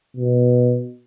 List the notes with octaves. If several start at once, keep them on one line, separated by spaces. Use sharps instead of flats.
B2